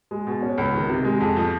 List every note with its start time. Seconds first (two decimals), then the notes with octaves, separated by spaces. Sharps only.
0.11 G#3
0.27 B2
0.42 C#4
0.58 C#2
0.74 D#3
0.89 C3
1.04 G#3
1.20 F2
1.37 F3